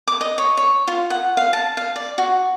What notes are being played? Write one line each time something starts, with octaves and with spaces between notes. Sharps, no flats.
D6
D#5
C#5
C#5
F4
F#5
F5
A5
F5
D5
F#4